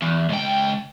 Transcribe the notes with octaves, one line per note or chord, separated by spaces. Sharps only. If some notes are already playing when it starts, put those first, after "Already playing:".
E2
C#2 G5